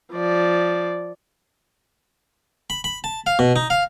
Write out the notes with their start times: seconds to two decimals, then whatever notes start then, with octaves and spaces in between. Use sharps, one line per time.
0.13 F3 D5
2.70 B5
2.84 B5
3.04 A5
3.27 F5
3.39 B2
3.56 D#4
3.70 F5